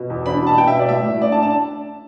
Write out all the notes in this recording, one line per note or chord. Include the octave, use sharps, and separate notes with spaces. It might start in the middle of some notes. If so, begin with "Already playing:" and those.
Already playing: B2
E2
D4 B5
B2 A5
B2 G5
E5
B2
D5
A2 E5
A2
D4 D5
A5
D4
A5